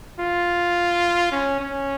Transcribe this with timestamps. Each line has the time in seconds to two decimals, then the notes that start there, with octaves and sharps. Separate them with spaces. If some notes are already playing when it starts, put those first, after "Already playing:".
0.19 F4
1.32 C#4
1.60 C#4